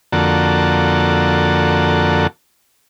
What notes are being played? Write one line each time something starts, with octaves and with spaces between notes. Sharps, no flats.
F2 D3 A#3 F#4 A4